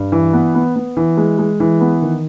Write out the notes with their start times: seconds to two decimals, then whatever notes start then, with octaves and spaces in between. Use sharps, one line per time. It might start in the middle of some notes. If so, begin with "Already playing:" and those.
Already playing: G2
0.12 E3
0.33 B3
0.55 B3
0.76 B3
0.97 E3
1.17 G#3
1.38 G#3
1.60 E3
1.81 B3
2.02 D#3